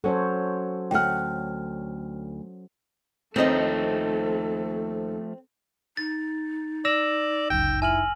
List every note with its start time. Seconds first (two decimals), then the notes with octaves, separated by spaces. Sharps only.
0.04 F#3 C#4 A4 C5 C#5
0.91 D2 F#5 G5 F6
3.36 D#2 F3 A3 C4 D#4 A4 D#5
5.97 D#4 A6
6.85 D5 E6 A#6 E7
7.50 G1 C#2 F#2 G5
7.82 E4 G#5 F6 F#7